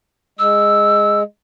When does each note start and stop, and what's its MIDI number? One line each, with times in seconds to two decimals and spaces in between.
0.39 1.23 56
0.39 1.20 88